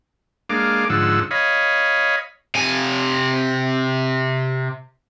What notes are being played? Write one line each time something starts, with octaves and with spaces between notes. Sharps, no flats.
G#3 A#3 D4 F5 D6
G#2 D3 F3 F#5 E6
C#5 D#5 F5 B5
C3 G#5